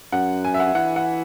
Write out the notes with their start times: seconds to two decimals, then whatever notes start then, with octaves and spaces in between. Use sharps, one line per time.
0.12 F#2 F#5
0.45 G#5
0.54 E5
0.60 F#5
0.75 E3 F#5
0.96 F#5